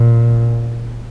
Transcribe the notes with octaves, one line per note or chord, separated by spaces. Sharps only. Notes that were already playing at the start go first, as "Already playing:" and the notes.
Already playing: A#2